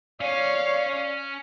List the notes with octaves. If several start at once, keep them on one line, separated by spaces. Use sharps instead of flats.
C#4 C#5 D5 F5 G#5